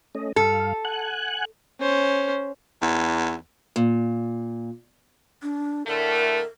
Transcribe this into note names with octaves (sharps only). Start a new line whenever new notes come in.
A3 C#4 D#5
G2 A4 F5
F#5 G#5 F#6
C#4 C5
E2
A#2
D4
A2 D3 A3 A#4